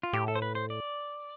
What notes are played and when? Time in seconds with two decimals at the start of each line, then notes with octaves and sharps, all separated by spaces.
0.03 F4
0.13 A2 G4
0.28 A4
0.35 C5
0.42 B4
0.55 C5
0.70 D5